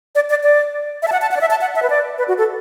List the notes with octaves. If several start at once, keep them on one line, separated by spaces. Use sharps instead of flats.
D5
D5
D5
E5
A5
F#5
A5
F#5
D5
E5
A5
F#5
E5
B4
D5
B4
F#4
A4